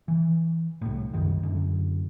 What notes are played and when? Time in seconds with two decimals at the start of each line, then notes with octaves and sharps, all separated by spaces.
0.08 E3
0.81 C2 A2
1.13 F1 C2 F#2 D#3
1.43 F#2 D3